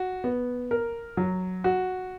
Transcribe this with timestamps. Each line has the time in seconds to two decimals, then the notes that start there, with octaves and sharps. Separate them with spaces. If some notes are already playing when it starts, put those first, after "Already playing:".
Already playing: F#4
0.24 B3
0.71 A#4
1.17 F#3
1.64 F#4